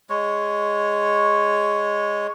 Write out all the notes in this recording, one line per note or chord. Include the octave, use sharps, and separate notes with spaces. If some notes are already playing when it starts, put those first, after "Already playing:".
G#3 C#5